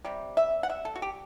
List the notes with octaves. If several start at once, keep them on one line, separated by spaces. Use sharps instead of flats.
C3 G3
E5
F#5
E5
A4
F#4
G4